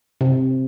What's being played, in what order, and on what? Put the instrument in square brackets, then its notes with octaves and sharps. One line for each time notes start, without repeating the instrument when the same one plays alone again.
[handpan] C3